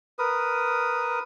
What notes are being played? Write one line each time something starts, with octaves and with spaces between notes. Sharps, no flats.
A#4 B4 D#6